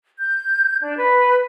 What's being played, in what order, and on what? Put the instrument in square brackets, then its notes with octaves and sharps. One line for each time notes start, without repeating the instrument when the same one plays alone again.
[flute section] G6
D4
B4